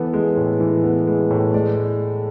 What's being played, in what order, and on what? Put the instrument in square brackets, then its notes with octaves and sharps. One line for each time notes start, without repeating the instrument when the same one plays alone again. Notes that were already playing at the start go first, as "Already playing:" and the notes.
Already playing: [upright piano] E3 B3 A4
G#3
A2
E3
B3
G#3
A2
G#3 D5